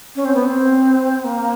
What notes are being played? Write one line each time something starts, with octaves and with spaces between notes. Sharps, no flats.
C#4
C4
B3
C4
A#3